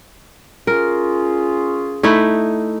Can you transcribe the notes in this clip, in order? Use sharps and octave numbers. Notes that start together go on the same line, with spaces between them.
C#4 F4 G#4 A#4
A3 D#4 E4